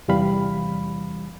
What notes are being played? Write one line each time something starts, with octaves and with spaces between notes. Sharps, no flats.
E2 C3 E3 G3 F5 B5